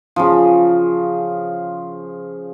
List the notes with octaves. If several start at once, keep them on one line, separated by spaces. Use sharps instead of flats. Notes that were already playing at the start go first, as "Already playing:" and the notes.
C#3 F3